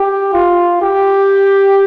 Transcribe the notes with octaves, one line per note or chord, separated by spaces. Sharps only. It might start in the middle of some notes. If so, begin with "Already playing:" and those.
Already playing: G4
F4
G4